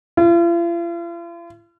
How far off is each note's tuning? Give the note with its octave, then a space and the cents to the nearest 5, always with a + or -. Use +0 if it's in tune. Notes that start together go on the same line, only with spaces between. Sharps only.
F4 -45